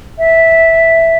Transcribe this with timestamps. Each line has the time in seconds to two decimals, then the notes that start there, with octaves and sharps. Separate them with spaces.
0.18 E5